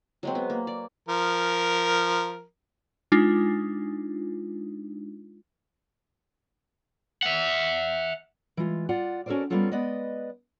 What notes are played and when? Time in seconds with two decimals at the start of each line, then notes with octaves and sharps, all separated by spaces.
0.23 F#3 G#3 C4
0.35 B3
0.50 A#3
0.67 D5
1.09 F3 A#4
3.12 G#3 D4 D#4 F4
7.23 E5 F#5
8.57 E3 G#3 F4
8.89 F4 D5 F#5
9.26 C#4 F#4 A4 A#4 C5 D5
9.50 G3 A#3 B3 C#4 F4 A4
9.72 G#3 B3 B4 D5 D#5